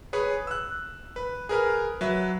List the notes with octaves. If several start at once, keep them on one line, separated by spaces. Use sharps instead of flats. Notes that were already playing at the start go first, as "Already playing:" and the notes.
G#4 B4 C#5 G#5
E6 F#6
B4
G#4 A#4 B4 F6
F#3 B4 E5